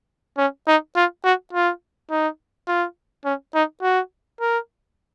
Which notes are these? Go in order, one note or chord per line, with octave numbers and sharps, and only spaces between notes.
C#4
D#4
F4
F#4
F4
D#4
F4
C#4
D#4
F#4
A#4